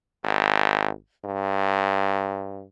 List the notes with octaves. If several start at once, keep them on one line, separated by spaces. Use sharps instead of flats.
G#1
G2